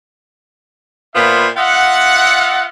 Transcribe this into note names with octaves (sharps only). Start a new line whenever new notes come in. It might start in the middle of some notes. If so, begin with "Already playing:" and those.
A#2 B3 F4 C5 E5 B5
F4 D#5 E5 F#5